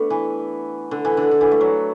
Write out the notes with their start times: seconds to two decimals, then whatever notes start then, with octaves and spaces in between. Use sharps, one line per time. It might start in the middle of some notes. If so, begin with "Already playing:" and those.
Already playing: A3 B3 D4
0.10 E3
0.91 D3
1.05 E3
1.17 D3
1.31 D3
1.41 E3
1.52 A3
1.61 F#3